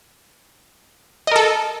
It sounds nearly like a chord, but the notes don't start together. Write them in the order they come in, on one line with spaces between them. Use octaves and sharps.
D#5 A#4 A4